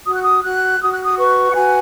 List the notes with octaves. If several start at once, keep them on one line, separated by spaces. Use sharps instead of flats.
F#4 D#6
F#6
D#6
F#4 F#6
F#4 D#6
F#6
D#6
B4 C#6
F#5
F#4 G#5